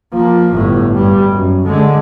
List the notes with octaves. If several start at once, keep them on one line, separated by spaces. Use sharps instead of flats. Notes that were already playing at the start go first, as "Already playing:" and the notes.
F3 A#3
G1 A2
G2 G3
F#2
D3 G#3